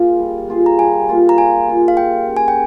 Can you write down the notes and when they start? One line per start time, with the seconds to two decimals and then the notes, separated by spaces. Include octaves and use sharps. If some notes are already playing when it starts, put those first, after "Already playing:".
Already playing: A#3 F4 G#4
0.19 G3
0.48 A#3 F4 G#4
0.66 A#5
0.79 G3 G#5
1.08 A#3 F4 G#4
1.29 A#5
1.37 G3 G#5
1.67 A#3 F4 G#4
1.88 F5
1.97 G3 G5
2.27 C#4 G#4
2.37 G#5
2.48 G5